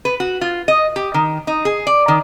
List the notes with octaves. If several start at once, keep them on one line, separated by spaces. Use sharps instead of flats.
B4
F#4
F4
D#5
G4
D#3
D#4
G#4
D5
D#3